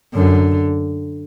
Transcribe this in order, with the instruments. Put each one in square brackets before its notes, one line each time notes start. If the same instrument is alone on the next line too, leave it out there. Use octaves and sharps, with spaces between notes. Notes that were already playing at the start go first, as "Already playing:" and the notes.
[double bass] F#2 [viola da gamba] D3